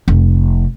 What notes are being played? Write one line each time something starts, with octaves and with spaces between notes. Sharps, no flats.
F1